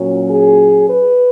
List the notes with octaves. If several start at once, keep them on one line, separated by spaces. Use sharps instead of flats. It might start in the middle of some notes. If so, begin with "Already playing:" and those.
Already playing: A#2 F#3 C#4
G#4
B4